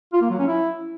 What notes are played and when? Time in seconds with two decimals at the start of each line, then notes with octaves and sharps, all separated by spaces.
0.13 F4
0.21 A#3
0.30 F#3
0.39 C#4
0.47 E4